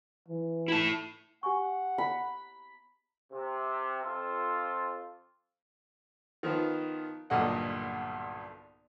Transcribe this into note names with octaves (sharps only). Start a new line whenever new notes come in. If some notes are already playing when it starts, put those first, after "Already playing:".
E3
E4 A5
G4 F#5 G#5 C#6
B5
C3
F2 F4 A4 C5
D#3 F3 B3 F4
B1 G2 A#2 D3 D#5 F#5